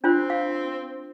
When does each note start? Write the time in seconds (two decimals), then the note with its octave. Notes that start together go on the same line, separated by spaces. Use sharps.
0.04 C4 D4 F4 C5
0.30 F5